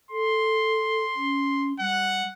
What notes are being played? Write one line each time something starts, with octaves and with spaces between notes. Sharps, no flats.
A4 C6
C#4
G3 F#5